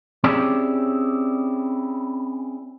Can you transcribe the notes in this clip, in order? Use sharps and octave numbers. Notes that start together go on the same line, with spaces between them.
C4 C#4 E4 G4 G#4 D5